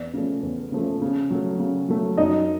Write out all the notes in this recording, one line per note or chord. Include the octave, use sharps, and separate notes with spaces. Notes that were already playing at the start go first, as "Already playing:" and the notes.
Already playing: E2 D5
C#3 F3 A3
E2
C#3 F3 A3
C#3
F#3 A3
C#3
F#3 A3
F#2 D#4 D#5